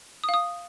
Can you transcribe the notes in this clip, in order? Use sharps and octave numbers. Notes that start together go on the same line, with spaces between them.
D#6
F5
D#6